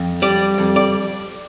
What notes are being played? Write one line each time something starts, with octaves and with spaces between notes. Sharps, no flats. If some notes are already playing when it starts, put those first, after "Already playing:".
Already playing: F2
G3 D5
F2
D5